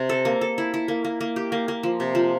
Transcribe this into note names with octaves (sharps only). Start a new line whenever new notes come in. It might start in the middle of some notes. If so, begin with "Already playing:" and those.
Already playing: C3 C4
A4
A#3
A4
E4
E4
A#3
A#3
A#3
G4
A#3
A#3
F3
C3
F3